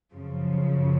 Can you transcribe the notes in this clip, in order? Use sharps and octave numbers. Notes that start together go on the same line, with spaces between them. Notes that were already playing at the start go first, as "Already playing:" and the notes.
F#2 C#3 F3